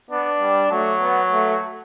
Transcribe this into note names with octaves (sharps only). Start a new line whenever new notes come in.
B3 D4
G3
F#3 A3
B3
A3